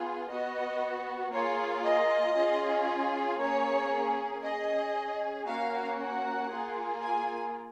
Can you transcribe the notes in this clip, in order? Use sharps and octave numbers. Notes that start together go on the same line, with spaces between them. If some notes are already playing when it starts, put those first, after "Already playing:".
Already playing: B3 F4 G#4
B3 F#4 D#5
A#3 F4 G#4 C#5
D#5
C#4 F4 G#4
A#3 C#4 G#4 C#5
C#4 G#4 D#5
A#3 C#4 F#4 F5
F#5
A#3 F4 G#4
G#5